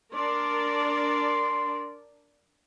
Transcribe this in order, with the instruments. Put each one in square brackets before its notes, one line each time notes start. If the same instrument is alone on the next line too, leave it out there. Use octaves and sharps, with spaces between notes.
[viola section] D4 A#4 D5 [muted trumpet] C6